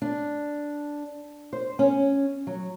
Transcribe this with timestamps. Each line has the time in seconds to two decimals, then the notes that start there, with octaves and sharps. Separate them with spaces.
0.02 D4
1.53 C5
1.79 C#4
2.47 F#3